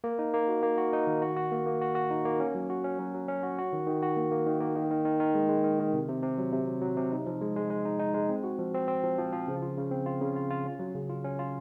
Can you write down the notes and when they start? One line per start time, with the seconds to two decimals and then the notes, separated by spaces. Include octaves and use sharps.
0.04 A#3
0.19 D#4
0.34 A#3
0.48 F#4
0.63 A#3
0.78 F#4
0.93 D#4
1.07 D#3
1.22 F#4
1.37 F#4
1.52 A#3
1.66 A#3
1.81 F#4
1.95 F#4
2.11 D#4
2.25 A#3
2.40 C#4
2.55 F#3
2.70 F#4
2.84 C#4
2.99 F#3
3.14 F#3
3.28 C#4
3.43 F#4
3.58 F#4
3.73 D#3
3.87 D#3
4.03 F#4
4.17 A#3
4.32 A#3
4.47 D#3
4.60 A#3
4.76 D#3
4.91 D#3
5.05 D#3
5.20 D#3
5.34 G#3
5.49 G#3
5.64 D#3
5.79 D#3
5.94 C3
6.09 C3
6.23 C3
6.38 F#3
6.53 C3
6.67 F#3
6.82 F#3
6.97 C3
7.12 D#4
7.26 F3
7.41 G#3
7.56 G#3
7.70 G#3
7.85 D#4
7.99 D#4
8.14 G#3
8.29 C4
8.44 F#4
8.59 F3
8.74 C4
8.88 C4
9.04 F3
9.18 F3
9.33 F3
9.48 C#3
9.62 F4
9.77 C#3
9.91 C4
10.06 F4
10.21 C#3
10.36 F4
10.50 F4
10.65 C#4
10.79 F#3
10.95 C#3
11.09 F4
11.24 C#4
11.39 F4